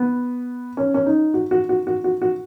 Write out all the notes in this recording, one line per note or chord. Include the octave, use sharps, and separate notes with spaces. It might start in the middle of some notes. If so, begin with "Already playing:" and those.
Already playing: B3
C#4
C#4
D#4
F#4
F#4
F#4
F#4
F#4
F#4